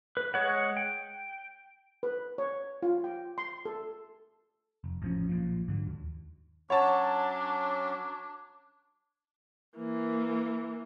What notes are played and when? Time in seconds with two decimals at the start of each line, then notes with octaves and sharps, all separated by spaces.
0.17 B4
0.34 G#3 C#5 F#5
0.77 G5
2.03 B4
2.38 C#5
2.83 F4
3.04 G5
3.38 C6
3.65 A4
4.84 F1
5.02 A1 F3 C#4
5.29 B1 A#2 F3
5.68 G#2 D3 F#3
5.86 D#2
6.70 F#3 C#4 D4 C#5 F#5 A5
9.77 E3 A#3